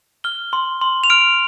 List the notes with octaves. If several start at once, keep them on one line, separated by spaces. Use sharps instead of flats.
F6 G7
C6
C6
F7
F6 D7